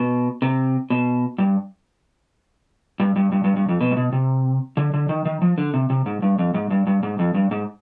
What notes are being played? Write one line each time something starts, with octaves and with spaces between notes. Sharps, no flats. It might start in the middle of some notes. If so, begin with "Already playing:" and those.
Already playing: B2
C3
B2
G2
G2
G2
G2
G2
G2
F2
B2
G#2
B2
C3
D3
D3
D#3
D#3
F3
D3
C3
C3
G#2
G2
F2
G#2
G2
G2
G#2
F2
G2
G#2